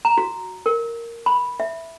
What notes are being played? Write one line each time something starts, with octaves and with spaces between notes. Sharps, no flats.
A#5
F#4
A#4
B5
E5